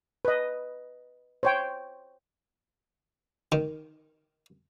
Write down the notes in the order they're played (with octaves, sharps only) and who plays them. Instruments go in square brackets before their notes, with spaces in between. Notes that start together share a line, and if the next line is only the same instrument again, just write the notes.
[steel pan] B4 D#5
C5 C#5 G5
[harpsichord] D#3